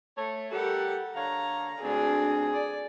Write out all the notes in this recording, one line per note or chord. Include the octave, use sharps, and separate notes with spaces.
A3 C#5
G3 G4 A4 A#4 F#5
D3 C#5 F5 A#5
D2 C4 D4 G#4
D5